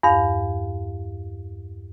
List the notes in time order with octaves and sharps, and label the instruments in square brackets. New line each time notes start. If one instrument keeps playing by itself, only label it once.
[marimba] E2 G2 F5